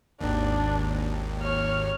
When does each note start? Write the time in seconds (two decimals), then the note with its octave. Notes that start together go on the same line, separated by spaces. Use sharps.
0.21 G#1 D#2 D4
1.42 C#5 F6